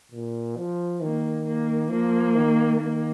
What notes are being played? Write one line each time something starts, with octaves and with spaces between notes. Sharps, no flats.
A#2
F3
D#3 A#3
A#3
F3 A#3
D#3
D#3 A#3